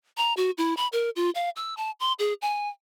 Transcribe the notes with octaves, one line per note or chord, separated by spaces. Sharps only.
A#5
F#4
E4
B5
A#4
F4
F5
E6
A5
C6
G#4
G#5